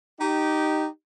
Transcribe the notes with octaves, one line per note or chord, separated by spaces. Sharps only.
D#4 G4